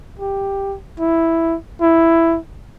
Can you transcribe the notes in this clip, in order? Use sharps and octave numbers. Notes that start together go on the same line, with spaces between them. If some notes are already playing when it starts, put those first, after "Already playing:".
G4
E4
E4